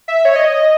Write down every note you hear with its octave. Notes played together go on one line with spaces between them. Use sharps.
E5
C#5
D#5